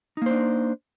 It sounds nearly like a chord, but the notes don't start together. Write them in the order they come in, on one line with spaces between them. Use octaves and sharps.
D#4 A#3 C5 D4